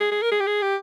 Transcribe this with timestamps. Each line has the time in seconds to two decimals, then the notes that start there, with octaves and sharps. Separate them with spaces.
0.01 G#4
0.11 G#4
0.22 A#4
0.31 G#4
0.40 G4
0.47 G#4
0.62 G4